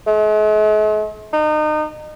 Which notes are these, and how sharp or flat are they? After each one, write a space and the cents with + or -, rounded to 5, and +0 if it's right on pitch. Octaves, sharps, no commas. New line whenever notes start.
G#3 +45
D#4 -30